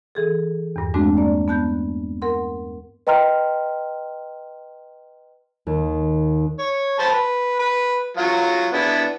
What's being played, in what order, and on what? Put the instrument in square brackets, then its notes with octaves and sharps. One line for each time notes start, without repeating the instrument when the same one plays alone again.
[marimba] E3 G#4 A4
E2 G2
G#3 A3 C4 D4 F#4
A#3 D5
B3 A5 F#6 G6
A#4 F#5 C6
[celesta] B4 D#5 G5 A#5 C6 F6
[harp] D#2
[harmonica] C#5
C5 A5 B5
B4
B4
F#3 F4 F#4
B3 D4 E4